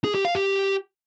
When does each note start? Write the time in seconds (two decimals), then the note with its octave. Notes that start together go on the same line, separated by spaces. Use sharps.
0.04 G#4
0.15 G4
0.25 F5
0.35 G4